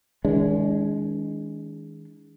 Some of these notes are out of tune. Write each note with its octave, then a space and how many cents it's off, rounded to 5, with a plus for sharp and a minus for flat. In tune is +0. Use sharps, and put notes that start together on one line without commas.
D#3 +35 G#3 +0 D4 -45